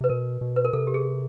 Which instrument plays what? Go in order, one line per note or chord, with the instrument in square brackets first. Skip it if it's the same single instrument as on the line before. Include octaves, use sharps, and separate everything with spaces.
[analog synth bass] C3 [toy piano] B4
[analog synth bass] B2 [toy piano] A#4
[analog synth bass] B2
[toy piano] B4
A#4
[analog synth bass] C3 [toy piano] A4
[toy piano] G4
G#4